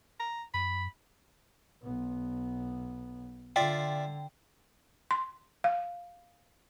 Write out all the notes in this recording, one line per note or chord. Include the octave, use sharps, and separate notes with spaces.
A#5
F#2 B5
B1 B3
D3 F4 D5 E5 G5
C6
F5